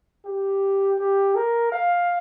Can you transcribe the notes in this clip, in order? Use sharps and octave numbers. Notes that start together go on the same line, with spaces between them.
G4
G4
A#4
F5